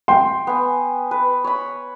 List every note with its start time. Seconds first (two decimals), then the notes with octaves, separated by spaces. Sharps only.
0.08 G5 C6
0.47 B3 G#5
1.11 B4
1.44 C#5 B5